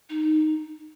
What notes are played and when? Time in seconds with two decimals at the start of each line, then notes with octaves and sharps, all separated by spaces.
0.09 D#4